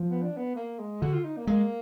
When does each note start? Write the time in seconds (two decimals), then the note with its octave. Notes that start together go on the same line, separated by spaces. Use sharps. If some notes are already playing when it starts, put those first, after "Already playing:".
Already playing: F3
0.10 B3
0.23 D4
0.37 B3
0.55 A#3
0.79 G#3
1.02 D3 F#4
1.13 F4
1.24 D#4
1.37 A#3
1.47 G#3 A#3